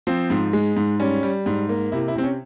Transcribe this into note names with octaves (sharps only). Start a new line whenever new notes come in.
F3 C4
G#2
G#3
G#2
G3 C#4
G3
G#2
A#3
C3 E4
E4
C3 C4
C#4